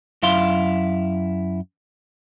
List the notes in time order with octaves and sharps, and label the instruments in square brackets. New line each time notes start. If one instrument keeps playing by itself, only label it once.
[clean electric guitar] F#2 E4 F5 C6